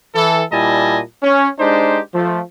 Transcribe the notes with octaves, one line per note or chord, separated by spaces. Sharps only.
E3 A4
A#2 G3 E4 D#5 G#5 A5
C#4
G#3 D4 D#4 G4 C5
F3 A3